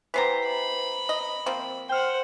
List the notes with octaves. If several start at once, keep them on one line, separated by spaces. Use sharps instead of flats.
E3 B3 G4 B4 C5 A#5
B5
D#5
F3 A#3 C4
C5 F#5 G5 F6